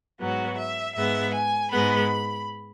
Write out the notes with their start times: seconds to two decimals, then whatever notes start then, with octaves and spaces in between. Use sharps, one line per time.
0.20 G#2 F#3 B3 F#4
0.59 E5
0.96 G#2 G#3 B3 E5
1.34 G#5
1.72 G#2 G#3 B3 B5